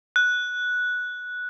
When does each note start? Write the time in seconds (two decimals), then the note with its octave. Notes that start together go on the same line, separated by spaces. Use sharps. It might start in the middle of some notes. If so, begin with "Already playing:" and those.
0.16 F#6